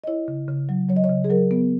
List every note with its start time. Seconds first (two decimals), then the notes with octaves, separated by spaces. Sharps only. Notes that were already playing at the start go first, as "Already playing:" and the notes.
0.04 D#5
0.07 E4 C#5
0.28 C#3
0.48 C#3
0.69 F#3
0.89 F#3 C#5
0.96 D#5
1.04 C#5
1.09 C#3
1.24 G#4
1.30 F#3 A#4
1.51 B3